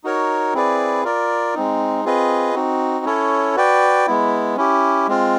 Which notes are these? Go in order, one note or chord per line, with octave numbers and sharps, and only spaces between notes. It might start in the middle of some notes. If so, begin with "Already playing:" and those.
D#4 F#4 A#4 C#5
C4 E4 G#4 B4 D5
F4 A#4 D5
G#3 C4 D#4
C4 F4 G#4 B4 D#5
C4 D#4 F#4
C#4 E4 A4 C#5
F#4 B4 D5 G5
G#3 B3 E4
C#4 E4 G4
G#3 C4 F4